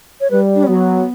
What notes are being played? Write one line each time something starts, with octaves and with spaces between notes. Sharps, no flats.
C#5
G3 B4
D4
C#4
F#3 B3